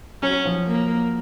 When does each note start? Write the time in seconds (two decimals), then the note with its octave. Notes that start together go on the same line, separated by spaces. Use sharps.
0.22 F#3 C#4
0.45 F3
0.67 A#3